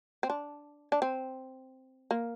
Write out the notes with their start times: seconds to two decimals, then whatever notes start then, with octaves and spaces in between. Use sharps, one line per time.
0.23 C4
0.30 D4
0.92 D4
1.02 C4
2.11 A#3